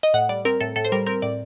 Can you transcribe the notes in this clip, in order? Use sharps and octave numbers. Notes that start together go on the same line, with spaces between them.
D#5
A2 F#5
G3 D5
C4 A#4
A2 A4
A2 A4
C5
G3 A#4
C4 A#4
A2 D5